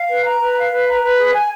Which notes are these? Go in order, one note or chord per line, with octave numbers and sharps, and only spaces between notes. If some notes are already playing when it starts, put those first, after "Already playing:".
Already playing: F5
B4
A#5
B4
F5
B4
A#5
B4
G#4
G#5